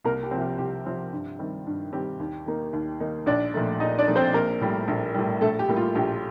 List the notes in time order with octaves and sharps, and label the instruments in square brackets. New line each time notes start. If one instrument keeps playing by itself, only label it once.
[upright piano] C2 A#3 A#4
G4
C3 F3 C4
G4
C2 G4
C3 F3 C4
G2
D#3 G3 C4
G2
D#3 G3 C4 G4
D#2
D#3 A#3 D#4
D#2
D#3 A#3 D#4
A#1 D4 D5
A#2 F3 A3 D#4
A#1 D#4 D#5
D4 D5
A#2 F3 A3 D#4
C4 C5
A#1 A#3 A#4
A2 G3
A#1
A2 G3
A#1 A3 A4
G4
A2 G3 A#3
F4
A#1 G4